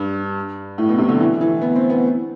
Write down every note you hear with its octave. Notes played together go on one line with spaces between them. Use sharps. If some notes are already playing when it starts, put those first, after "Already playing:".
Already playing: G2
A2
B2
C3
D3
E3
E3
B3
C4
B3